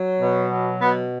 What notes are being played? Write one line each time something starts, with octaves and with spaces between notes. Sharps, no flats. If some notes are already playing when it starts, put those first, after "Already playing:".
Already playing: F#3
B2
F#3
B2 B3